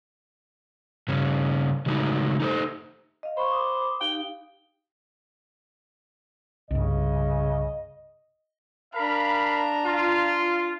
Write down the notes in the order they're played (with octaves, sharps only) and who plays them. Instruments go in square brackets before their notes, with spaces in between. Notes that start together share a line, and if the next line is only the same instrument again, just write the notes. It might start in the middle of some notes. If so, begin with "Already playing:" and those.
[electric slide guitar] G2 C#3 C#4
C#3 F#3 G#3 A3 D#4
D#4 A4 C5
[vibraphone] D#5 F5
[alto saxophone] C5 [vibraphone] B5 C#6
[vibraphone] B5 D6 D#6
[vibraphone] D#4 G4 F5 [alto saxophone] G5
[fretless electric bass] C2 G2 [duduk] C#3 [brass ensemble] D#5
[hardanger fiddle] D4 A#5 [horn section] A#4 F5 B5
[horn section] F4